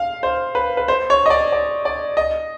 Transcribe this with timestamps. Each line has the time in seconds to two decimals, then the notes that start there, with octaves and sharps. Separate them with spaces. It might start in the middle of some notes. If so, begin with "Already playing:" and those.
Already playing: F5
0.23 C5
0.55 B4
0.77 B4
0.88 C5
1.10 C#5
1.26 D#5
1.30 D5
1.52 D5
1.85 D5
2.17 D#5